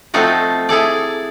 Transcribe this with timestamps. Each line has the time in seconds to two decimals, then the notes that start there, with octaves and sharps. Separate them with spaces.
0.14 F3 A3 C4 D#4 F4 F#4
0.69 E4 G#4 A4 D5